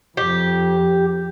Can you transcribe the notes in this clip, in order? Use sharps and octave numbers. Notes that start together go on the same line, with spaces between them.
F2 G4